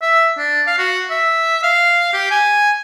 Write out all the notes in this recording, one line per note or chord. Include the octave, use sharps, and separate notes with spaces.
E5
D4
F5
F#4
E5
F5
G4
G#5